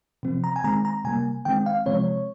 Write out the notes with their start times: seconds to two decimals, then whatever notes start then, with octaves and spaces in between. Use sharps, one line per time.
0.23 C3 F3 C4
0.44 A#5
0.56 G#5
0.64 D#3 G#3 C4 A#5
0.85 A#5
1.04 C3 G3 A#3 G#5
1.45 D#3 G#3 C4 G5
1.66 F5
1.86 C3 F3 G#3 C4 C#5